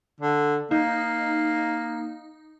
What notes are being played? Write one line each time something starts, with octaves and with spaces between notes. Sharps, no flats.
D3
A#3 D#4